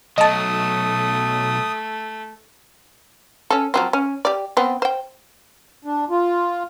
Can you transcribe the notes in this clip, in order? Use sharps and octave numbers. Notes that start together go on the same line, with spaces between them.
B1 F#3 A3 D#5 A5 D#6
C#4 A4
F3 F#3 C4
C#4
G4 D5
B3 C4
C5 G5
D4
F4